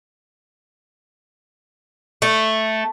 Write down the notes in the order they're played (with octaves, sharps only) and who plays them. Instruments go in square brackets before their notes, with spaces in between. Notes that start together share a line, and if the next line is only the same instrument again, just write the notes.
[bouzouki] A3